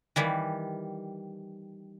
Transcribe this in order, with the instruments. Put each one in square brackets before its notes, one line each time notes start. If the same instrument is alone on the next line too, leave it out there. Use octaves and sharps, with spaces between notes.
[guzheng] D#3 E3 G3